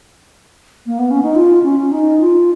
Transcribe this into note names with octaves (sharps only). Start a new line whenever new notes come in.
A#3
B3
C#4
D#4
F4
C#4
D#4
F4